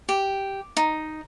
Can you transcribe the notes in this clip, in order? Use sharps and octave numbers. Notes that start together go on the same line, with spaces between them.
G4
D#4